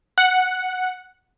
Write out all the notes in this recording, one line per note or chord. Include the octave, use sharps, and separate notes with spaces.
F#5